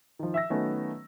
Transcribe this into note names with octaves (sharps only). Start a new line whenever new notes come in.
D#3 F3
E5 E6 A#6
D#3 F#3 A3 B3 C#4